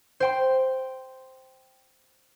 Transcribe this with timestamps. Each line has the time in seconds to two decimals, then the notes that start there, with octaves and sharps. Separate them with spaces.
0.20 C5 G5 C6